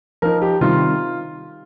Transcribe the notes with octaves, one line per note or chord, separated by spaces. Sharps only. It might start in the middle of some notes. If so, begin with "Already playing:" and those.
F3 D#4 A#4
G4
C3 D#3 G3 F4